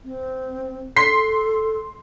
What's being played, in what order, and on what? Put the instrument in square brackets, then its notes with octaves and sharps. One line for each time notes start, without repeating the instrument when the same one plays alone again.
[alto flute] C4
[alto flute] A4 [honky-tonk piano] C6 B6 C7